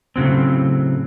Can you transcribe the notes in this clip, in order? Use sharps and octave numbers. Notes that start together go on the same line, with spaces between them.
A2 C#3 F#3 C4